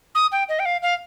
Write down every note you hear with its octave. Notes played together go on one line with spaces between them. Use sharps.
D#6
G5
D#5
G5
F5
F5